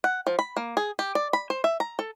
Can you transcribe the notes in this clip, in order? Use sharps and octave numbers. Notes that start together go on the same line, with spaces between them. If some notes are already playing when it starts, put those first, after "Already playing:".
F#5
F3
B5
A#3
G#4
G4
D5
B5
C5
E5
A#5
A4